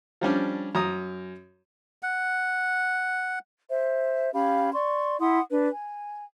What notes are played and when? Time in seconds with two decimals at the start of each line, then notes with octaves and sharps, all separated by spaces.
0.21 F3 G3 C#4 D4
0.75 F#2 A#5 D#6
2.03 F#5
3.71 C5 E5
4.33 C#4 G4 F5 B5
4.73 D5 C6 C#6
5.20 E4 F#5 C6 D#6
5.50 D4 B4
5.71 G#5